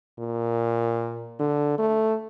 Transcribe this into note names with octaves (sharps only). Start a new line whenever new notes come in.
A#2
D3
A3